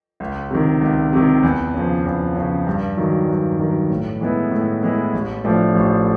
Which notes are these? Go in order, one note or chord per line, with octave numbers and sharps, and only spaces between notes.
C#2
C3 D#3
C#2
C3 D#3
E2
C#3 F3
E2
C#3 F3
G2
D#3 F#3
G2
D#3 F#3
A2
E3 G#3 B3 E4
A2
E3 G#3 B3 E4
A1
A2 F3 A3 D4
A1